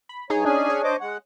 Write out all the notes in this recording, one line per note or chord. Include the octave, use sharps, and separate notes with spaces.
B5
G2 D#4 G#4 C#5
C#4 D4 G#4 G#5
C#5
C5 D#5 D6
G#3 F#5